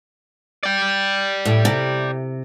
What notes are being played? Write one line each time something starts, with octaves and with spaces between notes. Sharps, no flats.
D5 G5
A2
C3